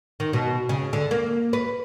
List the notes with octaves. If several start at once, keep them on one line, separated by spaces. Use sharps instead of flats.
D#3
B2
C#3
D3
A#3
B4